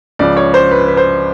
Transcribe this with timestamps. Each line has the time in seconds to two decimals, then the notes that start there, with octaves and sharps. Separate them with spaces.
0.19 C#2 C#3 F3 D5
0.37 C#5
0.54 C5
0.71 B4
0.88 B4
0.97 C5